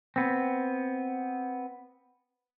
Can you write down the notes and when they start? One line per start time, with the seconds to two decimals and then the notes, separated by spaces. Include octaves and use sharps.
0.16 B3 C4